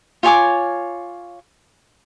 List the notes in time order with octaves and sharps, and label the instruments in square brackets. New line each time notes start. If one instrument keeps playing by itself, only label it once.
[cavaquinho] F4 C#5 G#5 D6